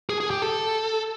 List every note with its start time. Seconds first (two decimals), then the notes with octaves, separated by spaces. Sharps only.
0.10 G#4
0.21 G#4
0.30 G4
0.42 A4